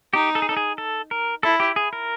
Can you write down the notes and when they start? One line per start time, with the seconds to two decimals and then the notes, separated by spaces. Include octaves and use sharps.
0.13 D#4 G4
0.35 A4
0.42 G#4
0.49 A4
0.57 G#4
0.78 A4
1.11 A#4
1.43 E4 A4
1.60 G4
1.76 G#4
1.93 A#4